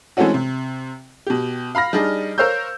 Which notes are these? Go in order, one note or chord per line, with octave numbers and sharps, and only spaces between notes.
E3 G#3 A3 C4 C#4 F#4
C3
B2 G4
F5 B5 F6 A#6
G3 D4 D#4 G#4 D#5
A#4 C5 C#5 F5 E6 G6